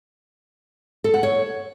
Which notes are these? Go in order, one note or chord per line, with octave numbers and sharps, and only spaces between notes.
A4
F#5
C#5